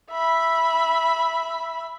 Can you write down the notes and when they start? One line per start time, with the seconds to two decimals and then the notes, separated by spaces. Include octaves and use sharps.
0.10 E5 B5